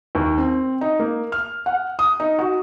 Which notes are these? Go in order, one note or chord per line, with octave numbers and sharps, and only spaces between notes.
D#2
C4
D#4
A#3
F6
F#5
D#6
D#4
F#4